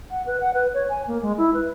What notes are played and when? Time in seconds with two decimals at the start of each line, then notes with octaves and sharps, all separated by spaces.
0.10 F#5
0.26 B4
0.40 F#5
0.54 B4
0.74 C#5
0.89 G#5
1.07 A#3
1.22 G#3
1.38 E4
1.54 B4